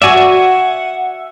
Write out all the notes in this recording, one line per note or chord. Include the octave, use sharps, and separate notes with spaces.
F#4 D5 E5 F#5 G#5